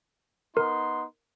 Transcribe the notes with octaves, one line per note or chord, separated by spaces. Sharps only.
B3 D#4 A#4 C6